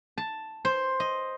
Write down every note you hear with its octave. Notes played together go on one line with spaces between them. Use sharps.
A5
C5
D#5